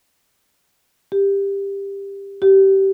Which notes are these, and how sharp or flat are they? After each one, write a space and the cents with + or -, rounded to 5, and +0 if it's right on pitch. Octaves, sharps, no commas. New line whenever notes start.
G4 +15
G4 -20